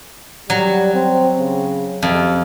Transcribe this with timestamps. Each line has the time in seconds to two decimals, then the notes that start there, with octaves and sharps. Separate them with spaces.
0.50 F#3 G3
0.94 C4
1.38 C#3
2.02 F2 C3